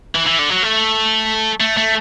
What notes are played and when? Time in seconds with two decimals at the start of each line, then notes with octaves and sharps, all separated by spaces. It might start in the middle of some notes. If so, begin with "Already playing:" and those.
0.15 E3
0.26 E3
0.39 D3
0.51 F#3
0.63 A3
1.60 A3
1.77 A3